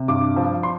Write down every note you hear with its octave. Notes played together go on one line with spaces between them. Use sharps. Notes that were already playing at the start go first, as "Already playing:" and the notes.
Already playing: C3
G2 D6
F3
C6